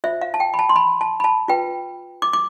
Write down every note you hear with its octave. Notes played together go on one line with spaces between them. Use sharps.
F4 C5 E5
F5
A5
G5
B5
A5
C6
B5
A5
B5
A5
F4 B4 G5
D6
D6